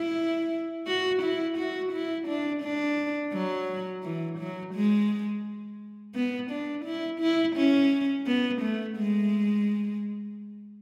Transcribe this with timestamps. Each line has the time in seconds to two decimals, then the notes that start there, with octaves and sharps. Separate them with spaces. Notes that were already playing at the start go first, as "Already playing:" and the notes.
Already playing: E4
0.87 F#4
1.22 E4
1.58 F#4
1.93 E4
2.28 D4
2.63 D4
3.33 F#3
4.04 E3
4.39 F#3
4.74 G#3
6.15 B3
6.51 D4
6.85 E4
7.21 E4
7.56 C#4
8.26 B3
8.62 A3
8.97 G#3